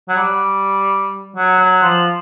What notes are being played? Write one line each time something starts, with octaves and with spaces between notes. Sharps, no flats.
F#3
G3
F#3
F#3
F3